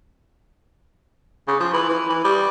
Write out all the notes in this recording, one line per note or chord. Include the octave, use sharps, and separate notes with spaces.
C#3
F3
E3
E3
E3
G3